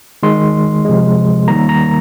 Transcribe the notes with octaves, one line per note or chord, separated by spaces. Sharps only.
D#3 G#3 C6
C3 F3 G#3
D#3 G3 A#3 A#5
A#5